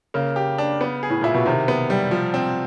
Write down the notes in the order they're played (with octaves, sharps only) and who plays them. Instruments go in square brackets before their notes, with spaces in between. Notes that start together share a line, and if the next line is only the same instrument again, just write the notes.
[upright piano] C#3 [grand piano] A#3
[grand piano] G4
D4
B3
G#4
[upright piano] A2
[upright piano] A#2 [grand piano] E4
[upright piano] B2
[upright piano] C3 [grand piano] D#3
[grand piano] B3
G3
F3
C4